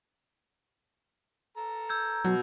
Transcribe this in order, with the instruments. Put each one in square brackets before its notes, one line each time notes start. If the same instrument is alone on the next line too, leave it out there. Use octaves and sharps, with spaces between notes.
[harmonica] A4 A#5
[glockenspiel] E6 G6 G#6
[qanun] B2 [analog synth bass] F#3